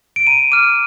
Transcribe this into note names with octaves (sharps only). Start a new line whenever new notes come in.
D7
A#5 D#7
D6 F6 D#7